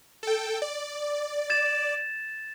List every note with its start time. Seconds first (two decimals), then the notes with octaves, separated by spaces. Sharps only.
0.23 A4 G5
0.62 D5
1.50 G#6 A6 E7